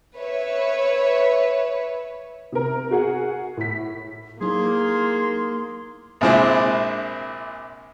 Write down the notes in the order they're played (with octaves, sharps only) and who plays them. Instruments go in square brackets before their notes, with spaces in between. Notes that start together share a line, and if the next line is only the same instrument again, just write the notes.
[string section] B4 C#5 E5
[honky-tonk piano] C3 A#4
F#4 G#4 F#5
A2 B6
[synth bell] F#3 D#4 E4 [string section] A#3 [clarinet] G#4 [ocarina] C6
[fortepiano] A#1 C3 G#3 C4 D4 E4